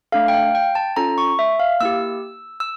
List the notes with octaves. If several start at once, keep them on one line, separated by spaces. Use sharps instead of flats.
A3 D4 A4 F5
G5
F5
G5
A5
C#4 F4 A4 A#5
C#6
E5
F5
A#3 E4 G4 E6
E6